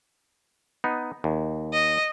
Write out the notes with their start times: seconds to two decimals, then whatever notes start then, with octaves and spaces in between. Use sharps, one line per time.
0.84 B3 D#4
1.24 D#2
1.73 D#5